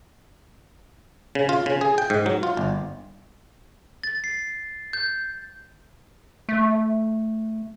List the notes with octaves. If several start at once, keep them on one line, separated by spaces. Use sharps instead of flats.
C#3
F4
C#3
G#4
G5
G#2
F#3
F4
G1
A6
C7
G6
A3